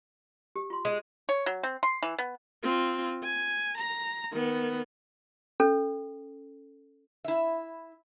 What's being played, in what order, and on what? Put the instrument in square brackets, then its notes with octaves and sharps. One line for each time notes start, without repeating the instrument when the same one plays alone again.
[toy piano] G4
F4 C6
[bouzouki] G#3
[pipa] C#5
F#3
C4
C6
E3
B3
[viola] C4 F4
G#5
A#5
D#3 B3
[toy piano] C#4 A4
[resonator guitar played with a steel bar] E4 E5